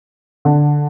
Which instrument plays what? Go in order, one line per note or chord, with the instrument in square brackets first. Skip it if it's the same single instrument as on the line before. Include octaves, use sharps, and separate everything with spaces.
[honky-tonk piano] D3